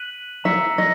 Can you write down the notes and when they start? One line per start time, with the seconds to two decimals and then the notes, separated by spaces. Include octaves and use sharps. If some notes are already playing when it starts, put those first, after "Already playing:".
Already playing: F#6 B6 D#7 F#7
0.44 E5 A#5 E6 A#6 C#7 E7
0.78 D#5